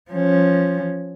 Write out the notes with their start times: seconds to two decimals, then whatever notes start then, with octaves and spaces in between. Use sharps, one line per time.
0.11 F3 C#4